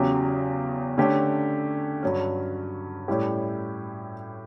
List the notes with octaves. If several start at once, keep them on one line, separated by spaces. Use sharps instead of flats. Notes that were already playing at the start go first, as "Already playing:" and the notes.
Already playing: E2 C#3 F#3 C#4 G4
D3 A3 C#4 G4
G2 F#3 C#4
A2 G3 C#4 E4 G4